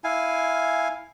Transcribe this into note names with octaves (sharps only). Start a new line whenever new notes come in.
E4 F5 G#5